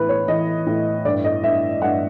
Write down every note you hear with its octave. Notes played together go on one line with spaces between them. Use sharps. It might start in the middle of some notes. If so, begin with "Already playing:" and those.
Already playing: A2 E3 B4
C#5
E3 D#5
A2
G2 D5
D#5
G2 E5
G2 F#5